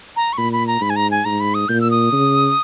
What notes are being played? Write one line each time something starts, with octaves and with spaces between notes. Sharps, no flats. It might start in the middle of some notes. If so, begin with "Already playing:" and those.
A#5
C#6
A#2 B5
B5
A#5
G#2 B5
G#5
A#5
G#5
G#2 A#5
B5
D#6
A#2 G6
E6
D#6
C#3